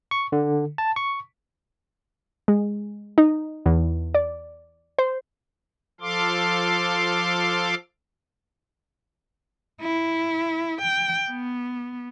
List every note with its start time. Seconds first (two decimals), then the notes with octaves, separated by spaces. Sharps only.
0.11 C#6
0.32 D3
0.78 A5
0.96 C#6
2.48 G#3
3.18 D#4
3.66 E2
4.15 D5
4.99 C5
6.01 F3 A4 F5 C6 D6
9.81 E4
10.81 G5
11.30 B3